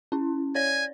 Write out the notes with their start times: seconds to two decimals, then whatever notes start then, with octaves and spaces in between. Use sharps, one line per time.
0.12 C#4 E4
0.55 C#5 D5 G#5